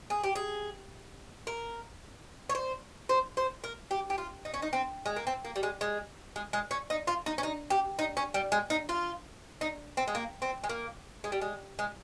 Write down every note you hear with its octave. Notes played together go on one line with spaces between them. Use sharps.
G#4
G4
G#4
A#4
C#5
C5
C5
C5
A#4
G4
G4
F4
D#4
C#4
D#4
C4
G#3
A#3
C4
A#3
G3
G#3
G#3
G#3
G#3
C#4
D#4
F4
D#4
C#4
D#4
G4
D#4
C#4
G3
G#3
D#4
F4
D#4
C4
G#3
A#3
C4
G#3
A#3
G#3
G3
G#3
G#3